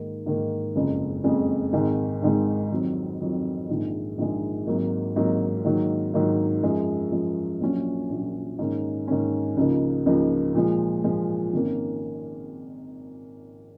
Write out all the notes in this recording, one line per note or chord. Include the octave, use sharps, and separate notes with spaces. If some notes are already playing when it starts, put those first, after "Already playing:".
Already playing: G#2 D#3 A#3
G#2 D#3 A#3
F#1 F2 C#3 G#3
F#1 F2 C#3 G#3
G#1 G#2 D#3 G#3
G#1 G#2 D#3 G#3
F2 D#3 F#3 C4
F2 D#3 F#3 C4
A#1 G#2 D#3 G#3
A#1 G#2 D#3 G#3
G#1 G#2 F#3 A#3 D#4
G#1 G#2 F#3 A#3 D#4
G#2 D#3 F#3 A#3 D#4
G#2 D#3 F#3 A#3 D#4
F#2 F3 G#3
F#2 F3 G#3
A#1 A#2 F#3 C#4
A#1 A#2 F#3 C#4
G#2 D#3 A#3 C#4
G#2 D#3 A#3 C#4
C#2 C#3 F3 A#3 D#4
C#2 C#3 F3 A#3 D#4
A#2 F3 G#3
A#2 F3 G#3
G#1 D#3 A#3 C#4